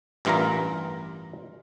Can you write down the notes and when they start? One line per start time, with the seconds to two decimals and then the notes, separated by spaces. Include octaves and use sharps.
0.25 A1 G2 E3 F4 A#4 A#5